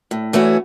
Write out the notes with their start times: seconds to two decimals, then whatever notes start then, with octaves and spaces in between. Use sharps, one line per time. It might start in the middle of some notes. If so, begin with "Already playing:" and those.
0.11 A2
0.33 E3 A3 C#4 F#4